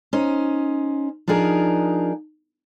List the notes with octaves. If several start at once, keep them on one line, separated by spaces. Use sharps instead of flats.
C#4 D#4 C5
F3 D4 D#4 G#4 A#4